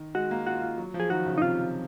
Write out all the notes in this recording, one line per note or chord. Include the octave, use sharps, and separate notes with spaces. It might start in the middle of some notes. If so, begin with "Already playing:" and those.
Already playing: D#3
G#3 F#4
A#3
F4 F#4
F4
F#3
F3
G#4
D#3 F#4
C#3
D#4
C3 F4